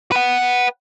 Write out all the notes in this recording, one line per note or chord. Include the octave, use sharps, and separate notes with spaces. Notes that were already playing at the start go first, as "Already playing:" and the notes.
B4 F#5